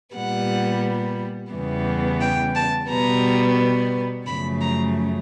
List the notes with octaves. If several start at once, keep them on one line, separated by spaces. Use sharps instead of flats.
A#2 G3 B3 F#5
E2 C#3 E3 G3 B3
G5
A5
B2 G3 B3 A#5
F#2 C#3 F3 A3 B5
A#5